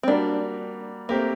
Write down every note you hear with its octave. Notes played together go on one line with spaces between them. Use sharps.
C4
G3 A#3 D4 F#4 A#4
A3 A#3 C4 G4 A#4